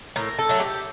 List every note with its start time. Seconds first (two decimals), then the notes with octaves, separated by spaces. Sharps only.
0.16 A2 A#4
0.39 A4
0.49 F#3 A3
0.60 G4